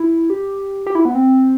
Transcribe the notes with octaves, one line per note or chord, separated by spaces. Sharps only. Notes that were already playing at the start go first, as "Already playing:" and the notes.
Already playing: E4
G4
G4
E4
B3
C4